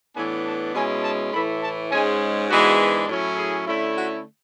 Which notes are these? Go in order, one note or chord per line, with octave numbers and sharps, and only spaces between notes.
A2 E3 B3 D4 G#5
A5
B2 G#3 C#4 E4 G#5
A5
A2 E3 A3 B5
A5
G#2 G#3 C#4 G#5
G#2 E3 G#3 B3 D4 F#4
A2 F#3 C#4 E4
G#4
D3 A3 C#4 E4
F#4